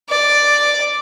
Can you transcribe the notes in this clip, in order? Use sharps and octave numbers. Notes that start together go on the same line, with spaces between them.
D5